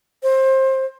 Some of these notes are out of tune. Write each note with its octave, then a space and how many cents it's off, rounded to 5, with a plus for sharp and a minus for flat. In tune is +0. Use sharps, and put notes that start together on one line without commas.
C5 +20